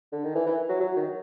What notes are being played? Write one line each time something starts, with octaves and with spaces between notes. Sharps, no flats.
D3
D#3
E3
E3
F#3
F#3
D#3